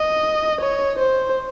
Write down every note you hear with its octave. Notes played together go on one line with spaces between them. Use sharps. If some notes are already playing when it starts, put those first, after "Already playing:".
Already playing: D#5
C#5
C5